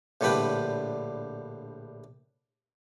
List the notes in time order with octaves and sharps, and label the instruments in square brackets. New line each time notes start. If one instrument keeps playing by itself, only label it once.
[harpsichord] A#1 A2 D3 G3 B4 G5